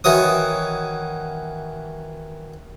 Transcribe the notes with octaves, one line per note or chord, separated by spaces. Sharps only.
D#3 E3 F#4 C#5 D#6